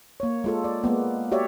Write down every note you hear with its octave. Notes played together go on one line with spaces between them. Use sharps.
A#3 C#5
G#3 F4 A4
D5
G#3 A#3 B3
F#4 G4 C#5 D5 E5